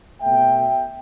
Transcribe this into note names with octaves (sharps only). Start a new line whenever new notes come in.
B2 A3 E5 G5